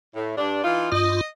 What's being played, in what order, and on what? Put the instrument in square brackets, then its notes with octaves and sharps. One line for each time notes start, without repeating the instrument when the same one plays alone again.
[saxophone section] A2
G2 D4
E3 D#4 F4
[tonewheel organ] G2 F4 [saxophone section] D#5